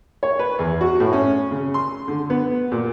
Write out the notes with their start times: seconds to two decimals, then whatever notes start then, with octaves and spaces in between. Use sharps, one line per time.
0.23 C#5
0.39 B4
0.59 E2
0.81 F#4
1.00 A2
1.13 C#4
1.51 C#3
1.74 C6
2.08 D3
2.30 B3
2.72 A#2